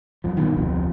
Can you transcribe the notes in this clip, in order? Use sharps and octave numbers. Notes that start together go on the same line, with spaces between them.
F#2 F3
G2 B2 D#3
F1 D2 C3 F3